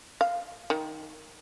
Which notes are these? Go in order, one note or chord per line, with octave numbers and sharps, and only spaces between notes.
F5
D#3